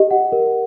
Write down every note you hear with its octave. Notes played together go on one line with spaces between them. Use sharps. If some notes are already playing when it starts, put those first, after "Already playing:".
Already playing: G4 D#5
F#5
A#4